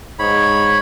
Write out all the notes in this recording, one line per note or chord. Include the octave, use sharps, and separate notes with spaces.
G#2 C#5 B5